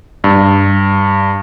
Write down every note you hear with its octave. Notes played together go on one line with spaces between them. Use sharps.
G2